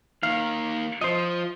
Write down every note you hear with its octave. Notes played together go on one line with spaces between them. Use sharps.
D#3 A#3 F5
F3 C5 D#5